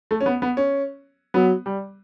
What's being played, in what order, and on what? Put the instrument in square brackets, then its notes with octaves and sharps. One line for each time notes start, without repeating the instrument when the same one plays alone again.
[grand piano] A3
C#4
B3
B3
C#4
[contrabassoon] F#3 [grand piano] B3
[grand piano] G3